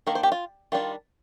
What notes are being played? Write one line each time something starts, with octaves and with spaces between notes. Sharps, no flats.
D#3 A#3 D4 A#4
C5
G4
F4
D#3 G3 D4 F4